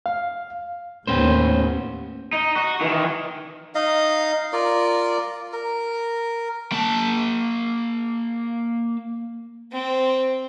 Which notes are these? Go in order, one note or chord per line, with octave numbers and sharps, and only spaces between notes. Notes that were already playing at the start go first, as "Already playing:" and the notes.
F5
D#2 A2 B3 C#4 C5
D#4
F#4
D#3 E3
D#4 D#5 F5
F4 A#4 D5
A#4
A#3 A5
C4